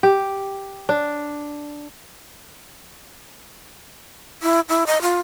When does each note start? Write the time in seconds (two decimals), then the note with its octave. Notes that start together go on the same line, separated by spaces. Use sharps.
0.03 G4
0.89 D4
4.43 E4
4.69 E4
4.87 D#5
5.02 F4